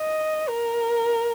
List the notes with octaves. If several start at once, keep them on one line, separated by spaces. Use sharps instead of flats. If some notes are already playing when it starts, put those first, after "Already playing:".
Already playing: D#5
A#4